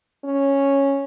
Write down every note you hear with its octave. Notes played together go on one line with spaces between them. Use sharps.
C#4